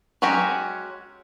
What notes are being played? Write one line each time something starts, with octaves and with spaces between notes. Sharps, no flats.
F#3 G#3 C#4 F#4 G4